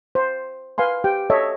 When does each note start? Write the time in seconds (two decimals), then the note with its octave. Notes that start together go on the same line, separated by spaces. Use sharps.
0.15 C5
0.78 B4 F5 G#5 C6
1.04 G4 G5
1.30 A4 C#5 D#5 E5